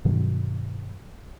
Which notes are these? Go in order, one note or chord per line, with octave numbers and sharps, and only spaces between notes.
G2 B2 D#3 F#3